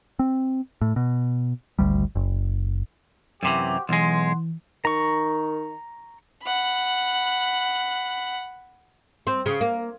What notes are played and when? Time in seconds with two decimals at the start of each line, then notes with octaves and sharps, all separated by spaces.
0.19 C4
0.81 A2
0.96 B2
1.79 G#1 D2 G3
2.15 F#1
3.43 F#2 C3 E3 F#4 G4 C5
3.89 B1 E3 G#3 F#5 C6
4.85 D#3 A#5 C#6
6.44 F#5 B5
9.27 C4
9.46 C#3
9.61 A#3